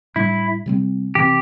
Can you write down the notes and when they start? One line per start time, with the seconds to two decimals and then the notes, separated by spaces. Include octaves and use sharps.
0.16 A2 G3 D4 E4
0.66 C3 G3 C4
1.15 C3 E3 C4 G4